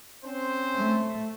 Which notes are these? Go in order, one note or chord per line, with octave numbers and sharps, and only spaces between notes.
C4 C#4 C5
A3